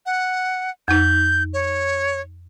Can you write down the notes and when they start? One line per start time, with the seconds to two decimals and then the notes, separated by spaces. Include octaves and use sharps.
0.06 F#5
0.88 F2 D#4 G6
1.53 C#5